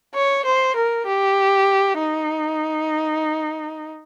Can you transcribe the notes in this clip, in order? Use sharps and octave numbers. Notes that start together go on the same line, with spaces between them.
C#5
C5
A#4
G4
D#4